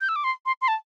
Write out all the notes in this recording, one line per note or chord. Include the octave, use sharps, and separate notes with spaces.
G6
E6
D6
C6
C6
C6
A5